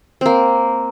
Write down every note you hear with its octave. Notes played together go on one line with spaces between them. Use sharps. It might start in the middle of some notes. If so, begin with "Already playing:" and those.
A#3 C4